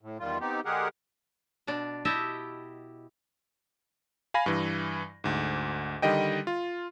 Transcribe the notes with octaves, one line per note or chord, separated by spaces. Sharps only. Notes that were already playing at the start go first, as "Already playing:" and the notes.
A2
E2 D#3 G3 F4
B3 C4 D#4 G4
D3 G#3 G4 G#4 A#4 F#5
B2 D4 D5
E4 G4 D#5 E5 G5 A5
F5 G#5 B5 A#6
G2 E3
D2 G#2
D3 D#3 G3 D#5 G5
F4